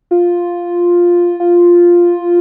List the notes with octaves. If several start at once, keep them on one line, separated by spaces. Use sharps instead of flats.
F4
F4